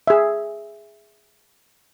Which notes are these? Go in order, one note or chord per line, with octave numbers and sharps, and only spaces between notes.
G#4 E5